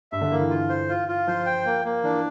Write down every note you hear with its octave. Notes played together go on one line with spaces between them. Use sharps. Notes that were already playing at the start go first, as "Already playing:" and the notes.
G2 E5
D3
E3 A#3
E3
F4
C5
F4
F4
F3 C5
G5
A#3
A#3
E3 D4